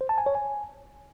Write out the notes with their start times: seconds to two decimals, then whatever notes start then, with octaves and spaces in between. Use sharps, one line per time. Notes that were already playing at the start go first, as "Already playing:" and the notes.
0.01 C5
0.09 A5
0.18 G#5
0.26 C#5
0.35 G#5